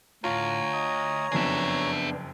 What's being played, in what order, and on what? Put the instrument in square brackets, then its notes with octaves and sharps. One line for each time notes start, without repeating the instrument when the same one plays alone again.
[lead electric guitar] D2 [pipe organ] A2 [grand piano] F4 [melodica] C#5 A#5
[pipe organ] D#5 D#6
[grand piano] F#1 F2 [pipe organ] B3 D4 [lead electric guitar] G#4 E5